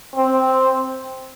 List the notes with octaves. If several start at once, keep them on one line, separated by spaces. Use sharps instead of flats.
C4